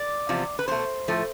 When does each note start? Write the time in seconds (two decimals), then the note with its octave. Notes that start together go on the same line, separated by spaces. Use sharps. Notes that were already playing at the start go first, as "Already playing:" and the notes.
Already playing: D5
0.29 E2 C3 F3
0.59 B4
0.68 B2 A3 C5
1.08 A2 F3 A3